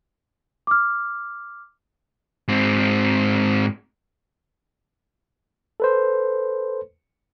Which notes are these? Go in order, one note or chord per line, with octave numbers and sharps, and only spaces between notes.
D6 F6
G#2 C4
A4 B4 C5